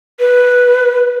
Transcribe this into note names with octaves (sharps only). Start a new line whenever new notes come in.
B4